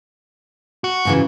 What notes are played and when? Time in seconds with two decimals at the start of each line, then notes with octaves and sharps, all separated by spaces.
0.84 F#4
1.05 G#2 C#3 E3